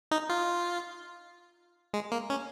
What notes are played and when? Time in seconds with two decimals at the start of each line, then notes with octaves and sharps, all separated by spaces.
0.11 D#4
0.29 F4
1.94 G#3
2.12 A#3
2.30 C#4